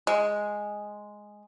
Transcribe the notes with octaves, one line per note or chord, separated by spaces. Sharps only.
G#3